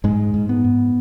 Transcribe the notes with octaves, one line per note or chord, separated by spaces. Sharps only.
G#2 G#3
G#2
B3
G#2